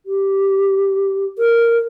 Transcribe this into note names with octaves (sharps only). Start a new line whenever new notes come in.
G4
A#4